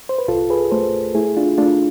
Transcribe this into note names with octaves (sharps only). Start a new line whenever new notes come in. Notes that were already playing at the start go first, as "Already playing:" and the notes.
C5
B4
C2 F4 A4
G#4 B4
A3 A4 C5
A3 E4 G#4
D4 F4
A3 D4 F4